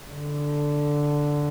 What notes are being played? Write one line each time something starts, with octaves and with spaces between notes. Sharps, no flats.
D3